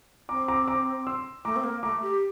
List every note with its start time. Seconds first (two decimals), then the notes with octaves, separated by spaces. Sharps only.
0.29 C4 A#5 D6
0.48 A#5 D6
0.68 A#5 D6
1.07 C6 E6
1.45 A3 A#5 D6
1.56 C4
1.64 A#3
1.83 A3 A#5 D6
2.02 G4